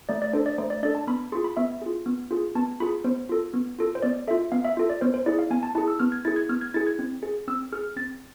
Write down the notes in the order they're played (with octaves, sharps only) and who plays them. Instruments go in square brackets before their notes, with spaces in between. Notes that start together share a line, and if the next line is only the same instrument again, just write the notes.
[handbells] A3 D5
D5
D4 A4 C5
D5
A3 C5
D5
D4 A4 D5
A5
B3 B5
F4 G#4 C6
B5
B3 E5
F4 G#4
B3
F4 G#4
B3 A5
F4 G#4 B5
B3 C5
F4 A4
B3
F4 A4
C5
B3 D5
F4 A4 E5
B3 F5
E5
F4 A4
D5
B3 C5
C5
E4 G#4 D5
F5
B3 G#5
A5
E4 G#4 A5
E6
B3 F6
G#6
E4 G#4 A6
G#6
B3 F6
G#6
E4 G#4 A6
G#6
C4
G#4
C4 E6
G#4 F6
C4 A6